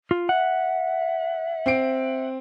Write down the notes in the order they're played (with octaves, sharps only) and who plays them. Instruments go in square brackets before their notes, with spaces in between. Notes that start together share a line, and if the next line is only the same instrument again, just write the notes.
[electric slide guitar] F4
[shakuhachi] E5 [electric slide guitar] F#5
[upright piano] C4 C7 D7